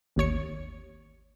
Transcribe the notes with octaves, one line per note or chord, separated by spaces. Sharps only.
G#1 D#2 C#5 C#7